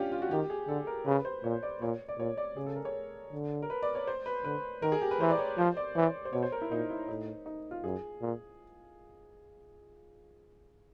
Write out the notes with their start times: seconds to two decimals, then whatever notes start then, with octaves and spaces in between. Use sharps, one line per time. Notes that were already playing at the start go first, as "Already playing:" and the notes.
Already playing: C#4 D4 F4 G4
0.12 F4
0.22 F#4
0.31 D#3 G4
0.50 G#4
0.68 D3 A4
0.87 A#4
1.06 C#3 B4
1.25 C5
1.44 A#2 C#5
1.63 D5
1.81 A#2 C#5
2.08 D5
2.19 A#2 C#5
2.37 D5
2.57 C#3 G#4
2.66 A4
2.76 A#4
2.85 C#5
3.32 D3
3.62 A#4
3.70 B4
3.82 D5
3.95 C#5
4.07 C5
4.26 B4
4.44 D3 B4
4.82 D#3 A#4
4.92 G#4
5.02 G4
5.11 B4
5.21 E3 C5
5.31 D5
5.39 C#5
5.58 F3 C5
5.77 D5
5.95 E3 C#5
6.25 C5
6.33 B2 C#5
6.43 C5
6.52 A#4
6.61 E4
6.71 A#2 D#4
6.90 E4
7.08 A2 D#4
7.46 D#4
7.71 F4
7.84 F#2 G#4
8.21 A#2